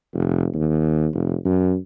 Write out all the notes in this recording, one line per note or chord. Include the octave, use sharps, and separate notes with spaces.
F1
D#2
F1
F#2